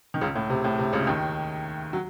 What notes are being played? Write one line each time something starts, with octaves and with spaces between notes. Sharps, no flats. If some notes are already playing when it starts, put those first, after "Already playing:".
D#3
C#2 C#3
A2
C3
A2
C3
C#2 C#3
D#2 D#3
F#3